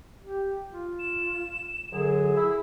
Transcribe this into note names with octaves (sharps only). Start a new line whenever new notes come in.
G4
F4
E7
F#2 D3 F#3 G#4
E4 E6